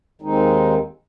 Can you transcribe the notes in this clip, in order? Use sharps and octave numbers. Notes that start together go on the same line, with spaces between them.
D#2 D#3 G#3 C4 D#4